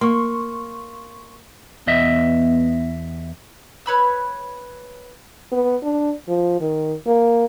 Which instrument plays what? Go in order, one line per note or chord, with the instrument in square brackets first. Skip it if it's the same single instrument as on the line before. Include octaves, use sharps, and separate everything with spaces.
[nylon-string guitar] A#3 [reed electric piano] C6 C#6
[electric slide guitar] E2 D#5 E5 [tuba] B3
[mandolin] B4 C#5 B5 E6
[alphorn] B3
D4
F3
D#3
A#3